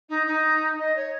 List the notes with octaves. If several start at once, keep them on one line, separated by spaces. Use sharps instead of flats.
D#4
D#4
D#5
C#5